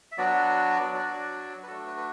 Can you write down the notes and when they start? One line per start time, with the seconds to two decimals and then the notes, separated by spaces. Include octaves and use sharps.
0.12 E5
0.18 F#3 B3 D4 F#4 D5
0.93 F#3 D4 F#4
1.63 B4
1.67 A3 D4 F#4 A4
1.87 B4
1.97 B4